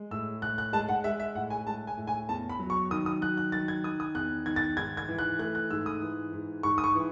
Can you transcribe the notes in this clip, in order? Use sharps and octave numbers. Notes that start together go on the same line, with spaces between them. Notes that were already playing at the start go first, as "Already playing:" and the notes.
Already playing: G#3
A2 E6
A2 F#6
F#6
G#3 A5
F#5
G#3 E5
E5
A2 F#5
G#5
G#3 A5
G#5
A2
G#5
E2 A5
B5
F#3
C#6
D#3 D#6
D#6
F#3 F#6
F#6
D#3 A6
G#6
D#3 D#6
D#6
E2 F#6
D#3 G#6
A6
G#2 G#6
G#6
E3
F#6
A3 F#6
F#6
G#2 E6
D#6
E3
G#2
G#2 C#6
D#6
C#6
E3